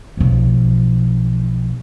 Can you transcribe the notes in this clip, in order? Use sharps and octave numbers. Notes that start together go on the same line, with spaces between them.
B1 F3